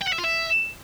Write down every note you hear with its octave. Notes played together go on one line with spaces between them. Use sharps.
G5
F#5
E5
F4
E5